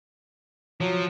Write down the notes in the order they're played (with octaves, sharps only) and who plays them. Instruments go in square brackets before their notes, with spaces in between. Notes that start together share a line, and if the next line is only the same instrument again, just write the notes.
[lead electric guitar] F3 [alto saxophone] F#3